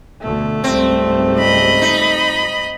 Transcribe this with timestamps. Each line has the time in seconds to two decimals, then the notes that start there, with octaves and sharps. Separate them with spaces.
0.21 D2 B2 D3 A3
0.64 C#2 G#2 G3 C4
1.38 D#5 B5
1.82 D#4